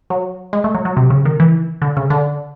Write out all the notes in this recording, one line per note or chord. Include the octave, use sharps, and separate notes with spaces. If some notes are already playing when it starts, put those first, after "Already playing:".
F#3
G#3
A3
F#3
F#3
C3
C#3
D#3
E3
D3
C#3
D3